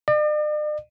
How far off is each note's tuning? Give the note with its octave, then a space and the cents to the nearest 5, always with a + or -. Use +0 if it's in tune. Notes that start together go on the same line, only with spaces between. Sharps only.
D5 +45